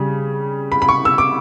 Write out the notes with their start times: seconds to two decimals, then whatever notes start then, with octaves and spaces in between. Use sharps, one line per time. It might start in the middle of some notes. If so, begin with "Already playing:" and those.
Already playing: C#3 G3
0.72 B5
0.82 B5
0.89 C#6
1.05 E6
1.18 D6